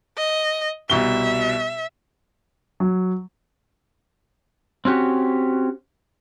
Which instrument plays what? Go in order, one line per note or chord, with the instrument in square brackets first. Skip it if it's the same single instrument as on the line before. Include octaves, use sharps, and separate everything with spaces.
[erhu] D#5
[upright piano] C2 B2 G7 [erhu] E5
[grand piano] F#3
[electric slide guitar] C4 C#4 F#4 G4